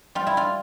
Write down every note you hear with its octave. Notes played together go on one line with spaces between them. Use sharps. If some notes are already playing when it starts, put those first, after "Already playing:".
G3 F4
E4
F4